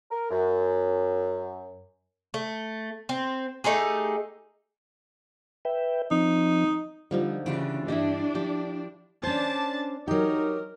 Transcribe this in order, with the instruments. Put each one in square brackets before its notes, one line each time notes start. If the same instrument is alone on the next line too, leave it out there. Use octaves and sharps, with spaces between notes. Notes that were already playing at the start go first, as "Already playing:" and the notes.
[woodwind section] A#4
F#2
[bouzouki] A3
C4
A3 D#4 G4 G#4
[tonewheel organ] B4 E5 G5
[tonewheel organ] F3 C4 [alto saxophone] D#4
[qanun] D3 F3 D#4 [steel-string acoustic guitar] G3
[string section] C#3 [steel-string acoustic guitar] E3 D4 F4 [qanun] G4 D5
[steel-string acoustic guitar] G2 E3 D#5 [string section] D4 [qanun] E4 G4
[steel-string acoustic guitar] F3 [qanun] G4
[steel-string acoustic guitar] C#4 C5 [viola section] D4 A5
[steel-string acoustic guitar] F#3 G4 [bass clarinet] D#4 [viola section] A#4